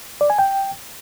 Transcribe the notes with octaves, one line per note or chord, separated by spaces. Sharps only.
D5
G#5
G5